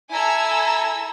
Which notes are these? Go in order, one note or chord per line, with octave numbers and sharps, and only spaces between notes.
E4 A4 G#5 A#5 E6